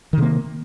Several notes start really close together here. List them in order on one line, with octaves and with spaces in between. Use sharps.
D#3 C3 A#3